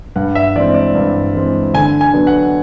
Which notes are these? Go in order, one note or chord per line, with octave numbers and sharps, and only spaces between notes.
G2 F#5
E5
E3 G#3 C4 D5
D5
G2
E3 G#3 C4
D3 G#5
G#5
F#3 B3 D4
F#5